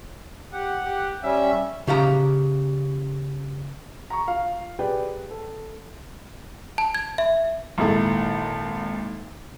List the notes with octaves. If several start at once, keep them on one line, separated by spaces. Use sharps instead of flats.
G4 F#5
G4
G3 C#4 E5
C#3 G4 F5 A#5
A#5 C#6
F4 F5
G4 G#4 B4 D5 G5
A4
A5
G#6
E5
G#1 A#2 E4 A4